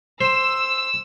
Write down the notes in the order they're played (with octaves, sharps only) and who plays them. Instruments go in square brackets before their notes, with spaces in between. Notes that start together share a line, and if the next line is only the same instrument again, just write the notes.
[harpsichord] C5 [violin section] E6